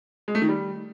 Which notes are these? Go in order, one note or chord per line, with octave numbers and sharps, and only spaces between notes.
G#3
A3
D#3
G3